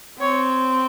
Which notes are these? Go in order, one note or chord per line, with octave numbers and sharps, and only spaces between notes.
C4 C#5